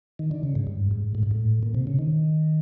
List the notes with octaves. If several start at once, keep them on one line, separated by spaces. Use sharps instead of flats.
D#3
D3
C#3
G#2
G2
G#2
A2
G#2
A2
A#2
C3
C#3
D#3